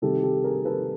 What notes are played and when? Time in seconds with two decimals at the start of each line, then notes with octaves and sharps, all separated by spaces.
0.02 C3 D#3 G3 G4 A4
0.23 G4 A4
0.43 G#4 A#4
0.65 A4 B4